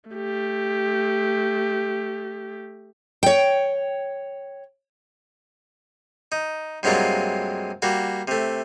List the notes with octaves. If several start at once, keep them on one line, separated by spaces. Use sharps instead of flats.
A3 G4
C#5 G5
D#4
G2 C3 F#3 G#3 A#3 F4
G3 A#3 F#4
C3 A3